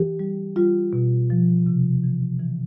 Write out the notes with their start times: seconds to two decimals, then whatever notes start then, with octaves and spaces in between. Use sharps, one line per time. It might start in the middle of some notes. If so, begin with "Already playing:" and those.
Already playing: E3 G4
0.19 G3
0.56 G3 F4
0.93 B2
1.30 F3
1.66 C3
2.04 E3
2.39 E3